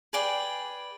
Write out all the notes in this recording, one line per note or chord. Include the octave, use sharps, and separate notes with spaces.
G#4 B4 D5 G5